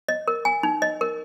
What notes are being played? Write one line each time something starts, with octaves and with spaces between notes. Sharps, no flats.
D#5
A#4
G#5
D#4
D#5
A#4